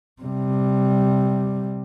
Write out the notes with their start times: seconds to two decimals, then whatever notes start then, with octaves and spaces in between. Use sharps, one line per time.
0.22 C3 G3